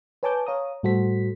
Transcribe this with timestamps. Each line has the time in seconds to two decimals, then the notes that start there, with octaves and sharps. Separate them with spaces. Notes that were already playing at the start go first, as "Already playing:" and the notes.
0.23 B4 C#5 G#5 A5 D6 G6
0.47 C#5 F5 A#5 D#6
0.83 A2 G3 F#4 A4 C5 B6